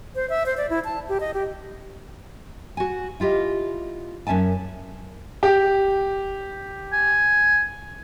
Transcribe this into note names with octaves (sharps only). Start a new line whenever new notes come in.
C5
E5
C5
D5
E4
A5
G4
D#5
G4
F#4 G#5
E4 F4 G4 D#5
F#2 C#4 E5 G#5 A5
G4
G#5